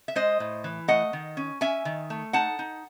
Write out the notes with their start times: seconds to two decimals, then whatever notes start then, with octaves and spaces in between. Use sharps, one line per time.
0.08 E5
0.15 G#3 C5 D#5
0.40 A2
0.64 E3
0.88 A3 D#5 F#5
1.13 D#3
1.37 C#4
1.61 C#4 E5 G#5
1.85 D#3
2.10 A3
2.33 D#4 F#5 A5
2.59 D#4